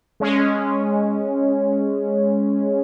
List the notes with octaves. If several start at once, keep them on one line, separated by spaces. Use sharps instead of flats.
G#3 C#4